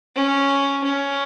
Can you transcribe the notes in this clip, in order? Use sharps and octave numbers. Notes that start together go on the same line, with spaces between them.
C#4
C#4